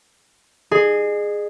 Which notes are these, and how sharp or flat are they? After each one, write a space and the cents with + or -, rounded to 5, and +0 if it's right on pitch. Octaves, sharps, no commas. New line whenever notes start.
G#4 +0 D#5 -40